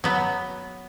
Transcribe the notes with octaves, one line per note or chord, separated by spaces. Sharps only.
F#3 B3